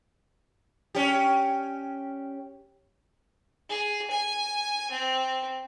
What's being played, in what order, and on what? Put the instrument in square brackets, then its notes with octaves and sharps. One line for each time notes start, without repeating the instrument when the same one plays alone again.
[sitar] C#4 G4
[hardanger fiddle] G#4
G#5
C4